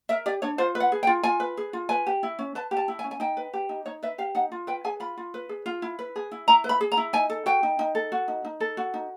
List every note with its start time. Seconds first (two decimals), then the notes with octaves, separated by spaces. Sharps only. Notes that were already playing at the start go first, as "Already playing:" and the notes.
0.09 A#4 E5
0.26 G4 D5
0.42 D4 C#5
0.58 F4 C5
0.75 B4
0.80 F#5
0.92 G#4
1.03 G5
1.07 F4
1.23 F4 G#5
1.40 B4
1.57 G#4
1.73 F4
1.89 B4 G#5
2.07 G4
2.23 E4
2.39 C#4
2.55 B4 A5
2.71 G4
2.77 A5
2.88 E4
2.99 G#5
3.04 C#4
3.11 G#5
3.20 D#4 G5
3.37 B4
3.53 G4
3.69 D#4
3.86 D#4 C#5
4.03 B4 E5
4.18 G4 F5
4.35 D#4 F#5
4.52 F4
4.67 B4 G5
4.85 G#4 G#5
5.00 F4 B5
5.17 F4
5.34 B4
5.49 G#4
5.66 F4
5.82 E4
5.99 B4
6.16 G#4
6.32 E4
6.48 E4 A#5
6.64 B4
6.69 B5
6.81 G#4
6.92 A#5
6.97 E4
7.13 D#4 G#5
7.30 A4
7.46 F#4 G5
7.63 D#4
7.79 D#4
7.95 A4
8.12 F#4
8.28 D#4
8.45 D#4
8.60 A4
8.77 F#4
8.94 D#4